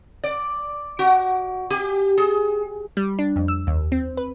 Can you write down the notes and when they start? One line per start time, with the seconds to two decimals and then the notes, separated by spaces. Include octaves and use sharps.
0.24 D5
0.99 F#4
1.70 G4
2.18 G#4
2.97 G3
3.19 D4
3.36 F2
3.48 E6
3.67 D#2
3.92 C4
4.17 B4